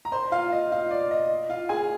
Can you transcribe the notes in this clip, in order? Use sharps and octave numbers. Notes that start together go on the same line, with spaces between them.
A#5
C5 C6
F4 F5
D#5
F4 F5
D5
D#5
F4 F5
G#4 G#5